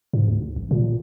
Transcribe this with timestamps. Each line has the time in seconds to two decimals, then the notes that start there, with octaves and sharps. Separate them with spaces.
0.13 G#2
0.28 D2
0.56 A1
0.71 A#2